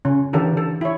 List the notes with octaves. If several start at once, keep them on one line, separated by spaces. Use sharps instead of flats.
C#3 C#4
D3 E3 G4 A4 A#4
A4
E4 C#5